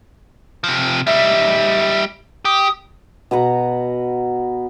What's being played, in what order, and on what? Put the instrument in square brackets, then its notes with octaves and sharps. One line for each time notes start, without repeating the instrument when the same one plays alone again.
[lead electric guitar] C3 F3
[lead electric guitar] G3 D#4 [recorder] E5
[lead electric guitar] G4 [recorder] D#6
[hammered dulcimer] B2 B4 F#5 A#5